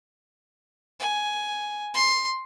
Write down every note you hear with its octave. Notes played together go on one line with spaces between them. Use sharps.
G#5
C6